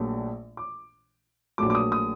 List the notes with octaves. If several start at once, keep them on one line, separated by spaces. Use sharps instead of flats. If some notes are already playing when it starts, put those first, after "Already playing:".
Already playing: A#1 A#2 F#3 A3
D6
A#1 A#2 F#3 A3 D6
D6
D#6
D#6